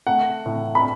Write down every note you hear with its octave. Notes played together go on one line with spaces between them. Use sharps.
A3 F#5
A2
B5